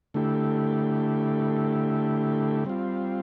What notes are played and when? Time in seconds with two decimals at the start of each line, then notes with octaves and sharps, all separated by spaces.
0.14 D3 A3 E4 G4
2.65 G3 C4 F4